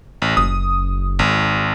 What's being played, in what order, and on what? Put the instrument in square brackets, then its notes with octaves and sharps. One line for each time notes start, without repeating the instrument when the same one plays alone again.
[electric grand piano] A1
[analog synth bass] F#1 [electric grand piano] D#6
[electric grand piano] G#1